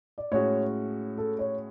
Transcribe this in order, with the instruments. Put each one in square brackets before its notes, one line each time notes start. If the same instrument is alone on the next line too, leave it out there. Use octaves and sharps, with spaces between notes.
[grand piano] D5
[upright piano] A2 G#3 C#4 F#4 [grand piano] C#5
[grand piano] A4
C#5